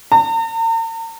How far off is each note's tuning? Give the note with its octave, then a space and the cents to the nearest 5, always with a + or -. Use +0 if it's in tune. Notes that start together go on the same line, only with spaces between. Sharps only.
A#5 -45